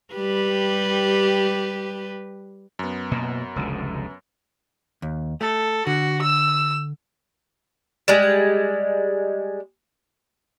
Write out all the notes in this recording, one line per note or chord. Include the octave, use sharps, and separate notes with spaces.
G3 G4 B4
F#2 B3
B2 A#3
F1 C#2 D3
D#2
A3 A4
D3 F#4
E6
G3 G#3